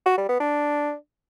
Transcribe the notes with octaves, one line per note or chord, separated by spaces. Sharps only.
F#4
G3
B3
D4